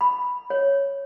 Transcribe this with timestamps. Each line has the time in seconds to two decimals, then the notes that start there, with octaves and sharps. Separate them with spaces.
0.01 B5
0.50 C#5